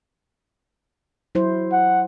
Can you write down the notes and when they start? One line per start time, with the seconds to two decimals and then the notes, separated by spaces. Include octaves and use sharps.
1.35 F#3 E4 C5
1.73 F#5